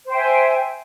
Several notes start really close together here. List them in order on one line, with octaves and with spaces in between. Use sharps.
C5 G5 E5 G#5